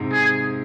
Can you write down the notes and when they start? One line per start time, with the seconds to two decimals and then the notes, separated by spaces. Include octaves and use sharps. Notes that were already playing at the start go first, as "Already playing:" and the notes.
Already playing: G#2 C3
0.13 G#4